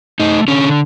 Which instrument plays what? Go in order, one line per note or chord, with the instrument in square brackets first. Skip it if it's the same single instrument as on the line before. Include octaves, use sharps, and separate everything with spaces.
[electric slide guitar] A3 D#4
D3 C#4